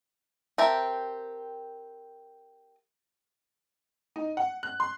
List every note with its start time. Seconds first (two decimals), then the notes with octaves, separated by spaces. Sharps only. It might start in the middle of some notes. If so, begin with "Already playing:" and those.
0.58 C4 G4 A#4 E5 A5
4.16 D#4
4.37 F#5
4.63 F#6
4.80 C6